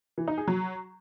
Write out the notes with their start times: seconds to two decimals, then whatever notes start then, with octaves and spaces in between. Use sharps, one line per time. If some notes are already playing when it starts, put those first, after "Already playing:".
0.18 E3
0.28 D#4
0.38 G#4
0.48 F#3